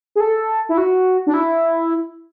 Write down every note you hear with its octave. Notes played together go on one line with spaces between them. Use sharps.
G#4
A4
E4
F#4
D4
E4